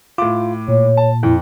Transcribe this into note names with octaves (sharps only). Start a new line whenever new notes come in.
A2 F4 D6
A#2 C#5
A5
F2 E4